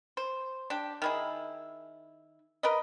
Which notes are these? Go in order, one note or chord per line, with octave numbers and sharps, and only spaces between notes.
C5
D4 G4
D#3 E4 G#4
A#4 B4 D#5